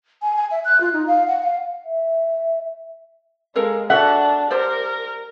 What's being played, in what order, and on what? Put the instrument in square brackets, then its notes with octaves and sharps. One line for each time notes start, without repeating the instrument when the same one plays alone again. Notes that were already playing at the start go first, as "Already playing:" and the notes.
[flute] G#5
G#5
E5
F#6
F4
D#4
F5
F#5
F5
[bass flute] E5
[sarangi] G#3 [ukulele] A4 A#4 F5
[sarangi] D4 [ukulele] F#4 A4 E5 [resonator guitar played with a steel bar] F#5
[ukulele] G4 C5 D5 [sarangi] A#4